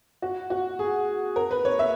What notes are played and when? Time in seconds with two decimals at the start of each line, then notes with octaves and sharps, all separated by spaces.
0.22 F#4
0.50 F#4
0.79 G#4
1.36 A#4
1.51 B4
1.65 C#5
1.79 E5